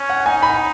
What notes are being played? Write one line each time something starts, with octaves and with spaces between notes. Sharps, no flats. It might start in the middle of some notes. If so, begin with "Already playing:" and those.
Already playing: C#4
F#5
D#4 G#5
B5